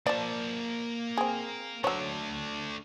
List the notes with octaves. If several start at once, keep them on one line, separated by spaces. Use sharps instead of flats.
F3 A#3 D5 A5
C4 G#4
F#3 A3 D4 C#5